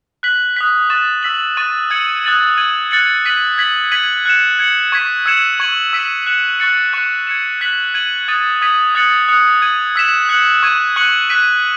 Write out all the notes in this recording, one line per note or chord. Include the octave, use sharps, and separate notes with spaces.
F#6 B6 F#7
D#6 F#6 B6
C#6 F#6 A6 E7
E6 B6 F#7
C#6 F#6 A6 D#7
E6 G#6 C#7 F#7
D#6 F#6 A6 D#7 F#7
G#6 D#7 F#7
F#6 A6 C#7 F#7
F#6 B6 D#7 F#7
G#6 B6 F#7
G#6 B6 D#7 F#7
F#6 C#7 E7
G#6 C#7 F#7
C#6 G#6 B6
E6 G#6 C#7 E7
C#6 G#6 D#7 F#7
E6 B6 D#7
F#6 C#7 E7
C#6 F#6 A6 C#7
C#6 F#6 C#7 E7
G#6 C#7 E7
F#6 B6 F#7
G#6 D#7 F#7
D#6 F#6 A6 D#7
D#6 G#6 B6 D#7 F#7
D#6 F#6 A6 C#7 F#7
D#6 F#6 C#7
G#6 D#7 F#7
E6 B6 E7
F#6 C#7 F#7
C#6 G#6 D#7
C#6 F#6 C#7 F#7
F#6 B6 D#7